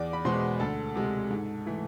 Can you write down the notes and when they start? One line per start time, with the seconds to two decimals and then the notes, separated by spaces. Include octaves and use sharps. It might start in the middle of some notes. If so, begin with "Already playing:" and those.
Already playing: E2 D5 D6
0.13 B5
0.25 B2 G#3 C5 C6
0.60 D2 A4 A5
0.95 C3 G#3
1.31 G#2
1.66 E3 A3